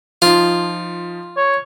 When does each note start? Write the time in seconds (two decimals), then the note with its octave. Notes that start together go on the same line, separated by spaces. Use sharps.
0.22 F3 D#4 F4
1.37 C#5